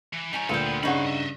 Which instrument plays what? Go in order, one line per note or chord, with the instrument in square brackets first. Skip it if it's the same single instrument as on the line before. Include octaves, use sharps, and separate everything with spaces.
[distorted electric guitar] E3
[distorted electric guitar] G3 C#5 [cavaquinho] D#4 G#5 A#5
[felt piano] D2 A#2 [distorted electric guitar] A#3 A4 [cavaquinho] B4 G5
[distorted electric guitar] F3 B3
[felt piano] G2 C#3 F#5 [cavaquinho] D#4 C#5 [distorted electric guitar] C5 B5
[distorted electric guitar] D#5 E5